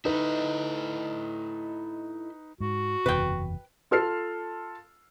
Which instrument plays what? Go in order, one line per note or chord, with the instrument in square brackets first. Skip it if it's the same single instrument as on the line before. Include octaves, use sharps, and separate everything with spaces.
[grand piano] D#4 B4 [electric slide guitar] E4 A4 D#5
[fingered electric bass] G#2 [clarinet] F#4
[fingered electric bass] F#1 E2 C3 [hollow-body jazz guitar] B4 G5
[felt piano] F4 A4 F6 C7